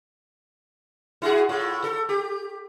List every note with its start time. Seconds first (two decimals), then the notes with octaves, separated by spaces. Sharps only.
1.22 E4 F#4 G#4
1.49 A2 F4
1.84 A4
2.09 G4